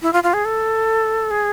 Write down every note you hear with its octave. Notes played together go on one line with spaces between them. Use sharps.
E4
F4
F4
G#4
A4
G#4